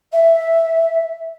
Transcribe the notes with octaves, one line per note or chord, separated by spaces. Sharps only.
E5